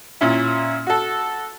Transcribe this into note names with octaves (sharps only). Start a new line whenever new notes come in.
A#2 C#4 E4
F#4 A4